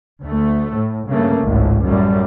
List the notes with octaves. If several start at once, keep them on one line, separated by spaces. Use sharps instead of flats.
D2 A3
A2
G2 C#3 A3 A#3
G#1 C#2 A2
A1 F#2 G3 A3